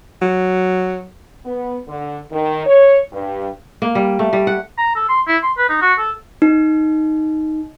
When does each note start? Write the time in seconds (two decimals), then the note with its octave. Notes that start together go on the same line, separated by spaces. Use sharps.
0.22 F#3
1.45 B3
1.88 D3
2.31 D#3
2.66 C#5
3.12 G2
3.82 A#3
3.95 G3
4.19 A3
4.33 G3
4.47 F#5
4.78 A#5
4.96 A4
5.09 C6
5.27 E4
5.43 C6
5.58 B4
5.69 D#4
5.81 F#4
5.99 A4
6.42 D#4